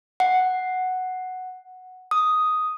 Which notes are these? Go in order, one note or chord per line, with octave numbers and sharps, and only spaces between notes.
F#5
D#6